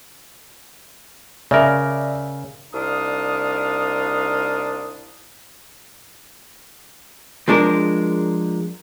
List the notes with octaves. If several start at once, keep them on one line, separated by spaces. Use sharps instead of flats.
C#3 A#4 D5 E5
C2 D4 D#4 F5 D#6
F3 G#3 D4 A#4